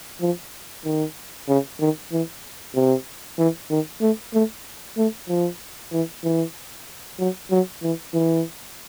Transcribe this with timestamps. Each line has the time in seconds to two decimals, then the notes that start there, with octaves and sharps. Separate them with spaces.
0.21 F3
0.85 D#3
1.48 C#3
1.80 D#3
2.12 E3
2.75 C3
3.38 E3
3.70 D#3
4.01 A3
4.33 A3
4.97 A3
5.29 F3
5.92 E3
6.24 E3
7.19 F#3
7.51 F#3
7.82 E3
8.14 E3